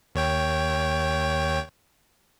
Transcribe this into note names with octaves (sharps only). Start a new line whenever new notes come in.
D#2 C#5 G5